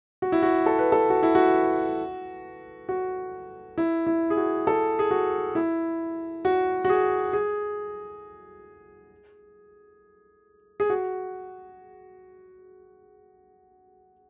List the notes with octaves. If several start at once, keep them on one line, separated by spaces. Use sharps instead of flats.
F#4
E4
F#4
A4
B4
A4
F#4
E4
F#4
F#4
E4
E4
G#4
F#4
A4
G#4
F#4
E4
F#4
F#4
G#4
G#4
G#4
F#4